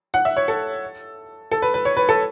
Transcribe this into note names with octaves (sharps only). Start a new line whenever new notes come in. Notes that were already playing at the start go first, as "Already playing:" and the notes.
F#5
E5
C#5
A4
A4
B4
B4
C#5
B4
A4